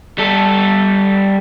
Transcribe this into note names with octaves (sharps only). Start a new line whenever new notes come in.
G3 A4